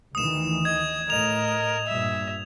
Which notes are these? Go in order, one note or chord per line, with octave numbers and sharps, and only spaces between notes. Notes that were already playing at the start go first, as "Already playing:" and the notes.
D2 D#3 E3 D#6 E7
D#5 G#6
A2 A#4 D#5 F7
G2 A#2 E5